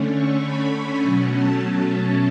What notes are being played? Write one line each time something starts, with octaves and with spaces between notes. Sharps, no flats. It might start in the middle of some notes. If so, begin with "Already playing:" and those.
Already playing: D3 A3 C#4
C#6
B5
B2 F#3 A3 C#4 G#5
A5
A5